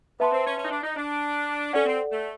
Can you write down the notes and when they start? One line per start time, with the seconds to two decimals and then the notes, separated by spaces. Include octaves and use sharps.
0.20 B3 B4 E5 A5 C6
0.32 C4
0.45 C#4
0.58 C#4
0.65 D#4
0.71 D4
0.83 D#4
0.96 D4
1.73 C#4 A4 D5 F#5
1.86 C4
2.12 A3